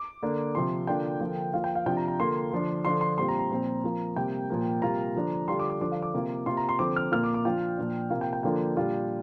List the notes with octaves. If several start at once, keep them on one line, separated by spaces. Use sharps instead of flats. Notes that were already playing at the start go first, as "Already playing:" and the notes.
Already playing: D6
D3 A#3 D4
C3 F3 C4 F4 C6
D3 A#3 D4 F4 G5
D3 F3 A#3 F4
F3 A#3 F4 F5
G5
F5
C3 F3 D4 F4 G5
A#5
A#5
D3 A#3 F4 C6
D3 F3 D4
D3 F3 D4 F4 C6
C6
A#2 G3 C4 F4 C6
A#5
A#5
A#2 F3 C4
F3 A#3 F4
C3 G3 A#3 G5
A#2 F3 A#3
C3 G3 A#3 F4 A#5
D3 F3 D4
D3 G3 D4 F4 C6
D6
D6
D3 F3 D4 D6
F5
D6
C3 A#3 F4
C3 A#3 F4 C6
A#5
C6
D3 F3 C4 D6
F6
A#2 A#3 F4 F6
D6
D6
F3 D4 F4 G5
A#2 F3 D4
C3 A#3 F4 F5
G5
G5
D3 F3 A#3 D4 F4 G5
A#2 G3 D4 F4